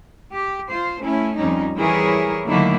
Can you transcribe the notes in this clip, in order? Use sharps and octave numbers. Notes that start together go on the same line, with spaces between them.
G4
F4 C5
A3 C#4 E4
F2 G3 C#4 D#4
E3 G3 E4 G#4 A#4 C#5
D3 D#3 F#3 A3 A#3 E4